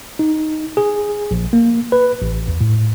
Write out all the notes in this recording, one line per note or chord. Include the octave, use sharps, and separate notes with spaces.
D#4
G#4
A#1
A#3
B4
A1
E2
A2